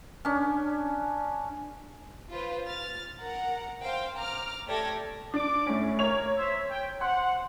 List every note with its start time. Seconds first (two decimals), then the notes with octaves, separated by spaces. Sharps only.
0.25 C#4 D4
2.31 F4 B4 C5
2.66 F6 A6
3.21 A#4 F#5 A#5
3.82 C5 F5 G5
4.17 A#5 D6 F6
4.67 A3 G4 A4 D5 G#6 A#6
5.34 D4 D5 D6
5.67 A2 C#4
5.99 A#3 A#4 C#5 F7
6.37 C5 E5
6.70 G5
7.01 C5 F#5 C6